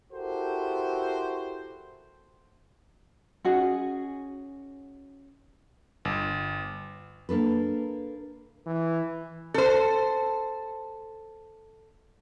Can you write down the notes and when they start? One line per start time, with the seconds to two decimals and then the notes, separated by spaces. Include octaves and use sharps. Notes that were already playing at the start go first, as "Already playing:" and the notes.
0.12 E4 F#4 G4 A4 A#4 C5
3.44 C#4 D#4 F#4 G#4
6.05 G1
7.29 A#3 D4 A4 B4
8.66 E3
9.54 A4 C5